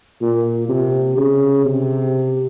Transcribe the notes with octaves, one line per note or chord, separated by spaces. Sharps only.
A#2
C3
C#3
C3